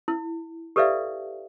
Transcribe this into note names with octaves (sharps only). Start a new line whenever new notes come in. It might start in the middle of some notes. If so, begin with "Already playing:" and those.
E4
G4 A4 B4 D5 E5 F5